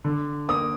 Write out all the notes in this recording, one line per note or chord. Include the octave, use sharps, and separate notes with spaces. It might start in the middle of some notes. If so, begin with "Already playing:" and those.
D3
A#3 D#6